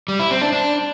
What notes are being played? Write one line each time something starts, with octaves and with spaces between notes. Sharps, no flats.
G3
E4
C4
D4
D4